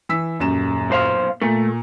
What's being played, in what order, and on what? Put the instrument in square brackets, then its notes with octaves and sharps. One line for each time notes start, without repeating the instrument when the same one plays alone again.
[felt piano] E3 E6 B6
D#1 F#2 E7
[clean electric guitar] B1 C5 F5
[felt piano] A#2 [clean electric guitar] A3